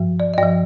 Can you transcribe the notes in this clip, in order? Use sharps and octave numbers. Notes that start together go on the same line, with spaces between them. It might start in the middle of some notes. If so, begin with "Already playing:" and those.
Already playing: G2 F3
D5
D#5
G2 F3 D5